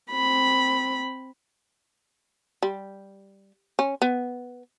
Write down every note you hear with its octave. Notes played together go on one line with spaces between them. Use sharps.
C4 B5
G3
C#4
B3